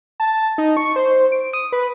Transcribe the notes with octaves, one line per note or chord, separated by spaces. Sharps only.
A5
D#4
C#6
C5
D7
D#6
B4